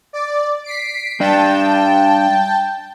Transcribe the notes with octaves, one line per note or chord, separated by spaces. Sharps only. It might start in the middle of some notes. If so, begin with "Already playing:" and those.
D5
B6 C7 D7
G3 D4 D5 G5 A5